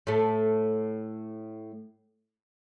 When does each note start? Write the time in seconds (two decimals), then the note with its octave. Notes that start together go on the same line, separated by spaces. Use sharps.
0.07 A2 A3